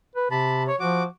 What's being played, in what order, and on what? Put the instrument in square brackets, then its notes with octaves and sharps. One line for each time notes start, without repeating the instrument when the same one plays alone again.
[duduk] B4
[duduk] C3 [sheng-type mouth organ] A5 B5
[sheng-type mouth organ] C#5
[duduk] F3 [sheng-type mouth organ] F#4 D6